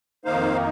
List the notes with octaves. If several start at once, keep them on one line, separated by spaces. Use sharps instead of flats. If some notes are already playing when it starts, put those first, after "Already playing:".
F2 D#3 A#3 D#4 C5 F5